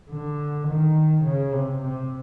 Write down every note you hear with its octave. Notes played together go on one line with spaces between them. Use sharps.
D3
D#3
C#3
C3
C3